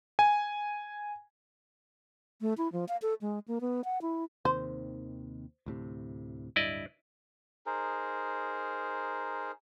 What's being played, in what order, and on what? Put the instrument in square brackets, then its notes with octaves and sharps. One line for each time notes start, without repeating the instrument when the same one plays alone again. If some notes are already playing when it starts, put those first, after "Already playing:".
[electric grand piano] G#5
[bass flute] A3
E4
F3
F5
A4
G#3
A#3
B3
F#5
E4
[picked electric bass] D#2 C3 D#3 [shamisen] C5
[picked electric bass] D2 A2 C3
[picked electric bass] D1 G2 [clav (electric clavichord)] E4 D5 D#5
[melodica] D#4 G#4 A#4 C5